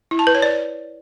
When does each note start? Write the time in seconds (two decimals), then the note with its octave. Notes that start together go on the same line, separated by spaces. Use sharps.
0.11 E4
0.19 A5
0.27 B4
0.35 C#5
0.42 D5